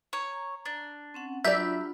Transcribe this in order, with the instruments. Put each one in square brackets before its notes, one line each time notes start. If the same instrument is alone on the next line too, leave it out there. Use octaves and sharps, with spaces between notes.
[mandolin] C#5 [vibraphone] A#5
[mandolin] D4
[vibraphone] C4 C#4 F#5
[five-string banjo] F#3 G4 D5 [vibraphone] D4 F4 B5 [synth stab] E5 [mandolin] G6